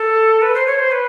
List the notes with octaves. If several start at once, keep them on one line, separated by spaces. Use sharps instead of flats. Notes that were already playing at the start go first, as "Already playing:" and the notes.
Already playing: A4
B4
C5
C#5
C5
B4